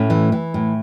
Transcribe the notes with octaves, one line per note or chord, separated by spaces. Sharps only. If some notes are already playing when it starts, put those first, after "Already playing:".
Already playing: A2 A3 C#4
E3
E3
A2